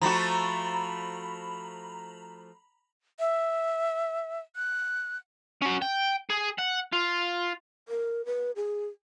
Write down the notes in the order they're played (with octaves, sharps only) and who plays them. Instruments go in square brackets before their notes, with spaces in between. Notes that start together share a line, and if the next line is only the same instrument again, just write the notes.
[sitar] F3 A3 F#4 [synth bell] A#5 B5
[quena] E5
F#6
[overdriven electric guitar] C#4 F#4
G5
G#4
F#5
F4
[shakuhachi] A#4
B4
G#4